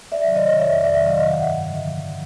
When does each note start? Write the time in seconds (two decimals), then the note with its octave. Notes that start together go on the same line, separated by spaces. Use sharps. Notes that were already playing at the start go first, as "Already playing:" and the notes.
0.12 D5 E5
0.24 C3 D#3 F#3
0.36 C#5 D#5
0.59 F2 D5 E5
0.84 D5 E5
0.96 C3 D#3 F#3
1.07 D#5 F5
1.31 G2 E5 F#5
1.67 D3 F3